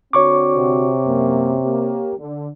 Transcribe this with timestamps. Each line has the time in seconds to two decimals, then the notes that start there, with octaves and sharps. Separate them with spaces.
0.13 D3 C4 F#4 C#5 C#6 D6
0.56 C3
1.05 F#2 A#3
1.62 A#3 G4
2.18 D3